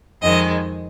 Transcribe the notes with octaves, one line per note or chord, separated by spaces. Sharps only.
F2 D#3 G#3 D#5